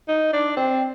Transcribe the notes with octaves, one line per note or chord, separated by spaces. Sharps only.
D#4
D4
C4